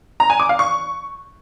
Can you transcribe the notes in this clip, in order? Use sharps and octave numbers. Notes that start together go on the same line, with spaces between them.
A#5
G#5
D6
F5
C#6